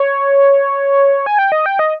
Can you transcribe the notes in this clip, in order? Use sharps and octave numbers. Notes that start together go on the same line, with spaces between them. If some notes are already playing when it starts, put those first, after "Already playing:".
Already playing: C#5
G#5
G5
D#5
G5
D#5